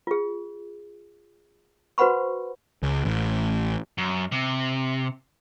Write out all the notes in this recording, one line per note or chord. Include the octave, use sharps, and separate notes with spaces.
F4 G#4
F#4 B4 C5 F#5 B5 C#6
C#2
A1
F#2
C3